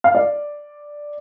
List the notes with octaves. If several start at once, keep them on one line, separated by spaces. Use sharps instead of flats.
F5
D5